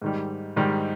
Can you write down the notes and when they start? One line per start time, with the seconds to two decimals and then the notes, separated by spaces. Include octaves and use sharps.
0.02 G#2 D#3 G3
0.56 G#2 D#3 G3